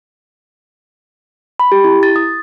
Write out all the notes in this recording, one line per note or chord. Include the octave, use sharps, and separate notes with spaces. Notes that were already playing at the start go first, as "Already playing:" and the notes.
B5
G4
E4
A6
D#6